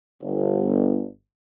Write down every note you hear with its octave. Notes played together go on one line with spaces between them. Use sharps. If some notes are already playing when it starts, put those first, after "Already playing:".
G1